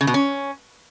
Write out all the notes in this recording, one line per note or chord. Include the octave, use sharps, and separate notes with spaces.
C#3
B2
C#4